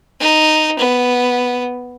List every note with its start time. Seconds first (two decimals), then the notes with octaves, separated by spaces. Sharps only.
0.20 D#4
0.79 B3